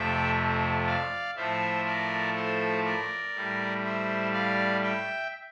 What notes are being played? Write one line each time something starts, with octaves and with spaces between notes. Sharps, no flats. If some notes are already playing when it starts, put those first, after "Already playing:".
Already playing: F2 C3 F3 A3 E5 G5
D5 F5
A2 F3 A3 C5 E5
A#4 D5
A4 C5
A#4 D5
A2 G3
C5 E5
D5 F5
E5 G5